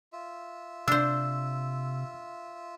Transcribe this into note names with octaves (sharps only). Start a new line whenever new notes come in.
F4 E5
C3 D4 C5 E6